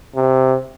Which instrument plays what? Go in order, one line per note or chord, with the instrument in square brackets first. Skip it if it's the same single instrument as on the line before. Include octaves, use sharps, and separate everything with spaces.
[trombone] C3